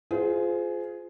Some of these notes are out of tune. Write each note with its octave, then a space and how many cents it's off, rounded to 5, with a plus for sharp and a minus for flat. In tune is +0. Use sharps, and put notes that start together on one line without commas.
F4 +0 G#4 +15 C5 -25